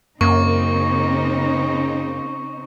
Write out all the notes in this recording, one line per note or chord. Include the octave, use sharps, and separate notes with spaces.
F#2 C#3 A#3 C4 D#4 C#6